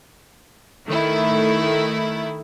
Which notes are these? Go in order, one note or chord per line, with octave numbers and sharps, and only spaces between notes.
D#3 A3 E4